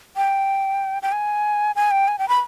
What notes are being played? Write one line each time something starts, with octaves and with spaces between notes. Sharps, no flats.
G5
G5
G#5
G#5
G5
G#5
G5
B5